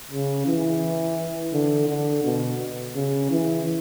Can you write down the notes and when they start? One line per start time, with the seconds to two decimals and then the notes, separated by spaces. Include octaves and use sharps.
0.11 C#3
0.47 E3
1.53 D3
1.89 D3
2.24 B2
2.95 C#3
3.31 E3